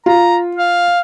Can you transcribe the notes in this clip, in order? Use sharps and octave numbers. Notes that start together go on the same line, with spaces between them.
F4 A#5
F5